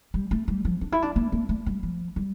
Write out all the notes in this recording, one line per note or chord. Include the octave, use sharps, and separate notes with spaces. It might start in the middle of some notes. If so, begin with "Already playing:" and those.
G3
A3
G3
F3
D4
E4
D4
A#3
A#3
A3
G3
F3
G3